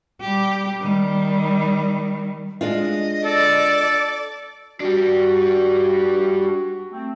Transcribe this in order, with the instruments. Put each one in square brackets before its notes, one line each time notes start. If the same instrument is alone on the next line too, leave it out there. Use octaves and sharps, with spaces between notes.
[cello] G3 G4
D#3 G3
[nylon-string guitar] G#3 D4 F4 [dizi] D#5
[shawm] A4 [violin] D5
[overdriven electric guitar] G3 D4 [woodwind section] F#4
[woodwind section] A3 C4